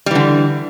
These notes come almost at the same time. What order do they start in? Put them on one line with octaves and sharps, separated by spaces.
G3 E3 D3